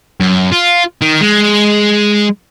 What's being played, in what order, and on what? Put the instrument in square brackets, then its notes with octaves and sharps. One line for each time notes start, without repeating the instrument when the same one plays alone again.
[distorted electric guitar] F#2
F4
D#3
G#3